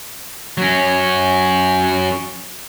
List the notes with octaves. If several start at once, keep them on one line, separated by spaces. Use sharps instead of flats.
F#3 C#4